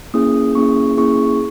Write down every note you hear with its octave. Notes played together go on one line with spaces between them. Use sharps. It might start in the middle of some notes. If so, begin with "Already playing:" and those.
A#3 C#4 E4 G#4 D#6
A#3 C#4 E4 G#4 C#6
A#3 C#4 E4 G#4 C#6